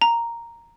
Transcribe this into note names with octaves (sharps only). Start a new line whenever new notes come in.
A#5